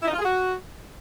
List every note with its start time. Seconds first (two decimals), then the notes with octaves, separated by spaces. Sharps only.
0.02 E4
0.08 D#4
0.13 F4
0.19 G#4
0.24 F#4